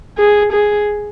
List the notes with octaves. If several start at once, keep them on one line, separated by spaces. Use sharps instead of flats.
G#4
G#4